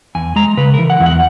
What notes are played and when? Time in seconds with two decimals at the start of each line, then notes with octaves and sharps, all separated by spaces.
0.15 E2 G#5
0.36 G#3 A#5
0.57 C#3 B4
0.74 A#4
0.79 E3
0.90 F#5
1.00 E2
1.06 F#5